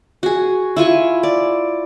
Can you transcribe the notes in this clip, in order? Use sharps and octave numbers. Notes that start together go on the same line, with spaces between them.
F#4 G#4
E4 F4 G#5 C#6
D5